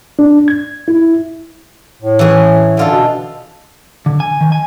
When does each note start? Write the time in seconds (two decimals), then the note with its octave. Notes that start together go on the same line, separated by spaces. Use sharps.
0.19 D4
0.48 G#6
0.88 E4
2.02 A2
2.19 E3 C#4 G#4
2.77 D3 F4 A4
2.91 B2
4.06 D3
4.20 G#5
4.41 D#3
4.52 G#5